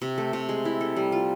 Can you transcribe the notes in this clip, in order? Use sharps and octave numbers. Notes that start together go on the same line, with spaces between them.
C3
A3
C3
G#3
E4
A4
G3
F4